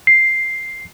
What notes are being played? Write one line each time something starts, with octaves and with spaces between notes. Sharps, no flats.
C7